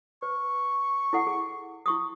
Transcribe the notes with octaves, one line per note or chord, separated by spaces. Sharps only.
B4 C#6
E4 A4 F#5
G#4
E4 C#6 D#6